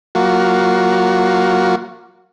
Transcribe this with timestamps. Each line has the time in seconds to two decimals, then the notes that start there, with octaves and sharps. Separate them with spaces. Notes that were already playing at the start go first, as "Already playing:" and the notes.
0.15 F#3 A#3 F4 F#4